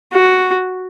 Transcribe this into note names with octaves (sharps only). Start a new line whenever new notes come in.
F#4